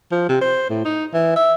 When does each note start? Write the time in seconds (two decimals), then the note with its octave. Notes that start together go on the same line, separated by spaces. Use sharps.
0.11 F3
0.29 C3
0.41 C5
0.70 A2
0.85 D#4
1.14 E3
1.36 E5